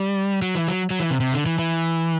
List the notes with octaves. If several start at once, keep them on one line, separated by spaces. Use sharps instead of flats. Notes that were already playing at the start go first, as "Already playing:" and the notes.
Already playing: G3
F#3
E3
F#3
F#3
E3
C3
C3
D3
E3
E3